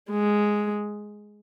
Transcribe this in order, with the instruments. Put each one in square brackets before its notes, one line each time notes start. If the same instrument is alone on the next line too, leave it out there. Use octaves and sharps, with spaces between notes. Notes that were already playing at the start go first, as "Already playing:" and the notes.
[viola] G#3